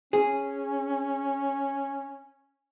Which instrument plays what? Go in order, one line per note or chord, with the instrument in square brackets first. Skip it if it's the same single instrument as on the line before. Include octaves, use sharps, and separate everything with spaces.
[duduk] C#4 [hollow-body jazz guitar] G#4